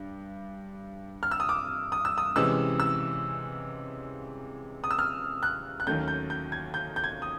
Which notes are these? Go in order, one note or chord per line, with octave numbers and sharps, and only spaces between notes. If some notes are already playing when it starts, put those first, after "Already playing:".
Already playing: G2
F6
E6
D#6
D6
D#6
E6
D#6
C3 E3 G#3 C#4 E6
E6
D#6
E6
F6
F#6
F#6
D#2 D#3 F#3 A3 C#4 G6
G6
G6
G#6
G6
G6
G#6
D#6